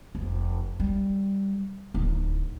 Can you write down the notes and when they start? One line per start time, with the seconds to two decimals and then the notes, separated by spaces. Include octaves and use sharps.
0.15 F1
0.80 G3
1.94 D1 D#4